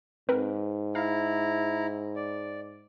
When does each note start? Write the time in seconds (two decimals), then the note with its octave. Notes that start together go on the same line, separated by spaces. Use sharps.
0.29 G#2 C4 A#4 B4
0.95 E4 F5 A#5
2.16 D5